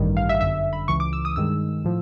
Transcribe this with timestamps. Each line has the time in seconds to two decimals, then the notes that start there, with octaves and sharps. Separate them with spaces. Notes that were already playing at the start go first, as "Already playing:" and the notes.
Already playing: A1 G2 D#3 G3
0.17 F5
0.29 E5
0.41 G1 F#2 D3 E5
0.73 B5
0.88 C#2 C#3 E3 C#6
1.00 D6
1.13 E6
1.25 D#6
1.36 G2 D#3 G#3 E6
1.85 A2 F3